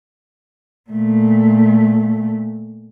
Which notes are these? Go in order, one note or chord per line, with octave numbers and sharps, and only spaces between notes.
A#2 A3